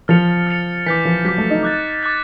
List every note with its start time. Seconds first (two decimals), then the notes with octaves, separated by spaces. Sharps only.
0.08 F3 F6 A6 C#7 F7
0.47 F6 A6 C#7 F7
0.86 E3 D6 G6 B6
1.05 F3
1.25 F#3 D6 G6 B6
1.38 A3
1.50 D#4
1.63 D6 F#6 A6
2.03 D6 F#6 A6